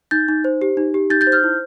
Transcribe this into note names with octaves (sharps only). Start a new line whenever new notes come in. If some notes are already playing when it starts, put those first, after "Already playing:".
D#4 G6 A6
D#4
C5
G4
D#4
G4
D#4 G6 A6
G6 A6
C5
F6 G6
E4